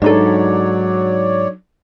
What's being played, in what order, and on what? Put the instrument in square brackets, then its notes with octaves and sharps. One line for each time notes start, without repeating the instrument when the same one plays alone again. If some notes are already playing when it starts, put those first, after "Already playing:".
[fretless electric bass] G#2 [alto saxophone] F#3 [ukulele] D4 D#4 A4 [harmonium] C#5 D5